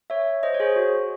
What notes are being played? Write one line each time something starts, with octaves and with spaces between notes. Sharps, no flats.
C#5 E5
C5 D#5
C#5
G#4 C5
F#4